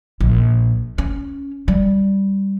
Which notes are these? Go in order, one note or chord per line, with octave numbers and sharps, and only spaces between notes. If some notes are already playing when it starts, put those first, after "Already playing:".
A#1
C#4
G3